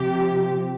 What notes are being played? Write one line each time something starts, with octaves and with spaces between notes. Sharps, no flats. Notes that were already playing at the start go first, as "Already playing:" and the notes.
Already playing: C3 F3 G4